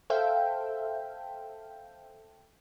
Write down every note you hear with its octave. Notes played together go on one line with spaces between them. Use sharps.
A4 C5 E5 F5 G5